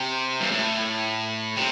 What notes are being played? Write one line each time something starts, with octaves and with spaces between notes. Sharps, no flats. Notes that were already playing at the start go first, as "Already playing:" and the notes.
Already playing: C3
G2
A2
C3